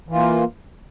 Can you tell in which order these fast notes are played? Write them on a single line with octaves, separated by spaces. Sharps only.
E3 F4 A#3